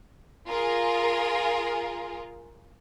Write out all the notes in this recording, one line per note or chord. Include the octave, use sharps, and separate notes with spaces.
F4 G#4 A#4